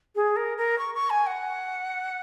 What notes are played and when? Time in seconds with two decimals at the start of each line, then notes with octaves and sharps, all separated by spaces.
0.15 G#4
0.36 A#4
0.57 A#4
0.78 C#6
0.94 C#6
1.10 G#5
1.26 F#5